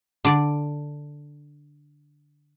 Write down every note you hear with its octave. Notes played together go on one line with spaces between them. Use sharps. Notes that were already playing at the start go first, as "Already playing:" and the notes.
D3 D5